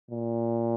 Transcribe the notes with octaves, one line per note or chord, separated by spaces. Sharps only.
A#2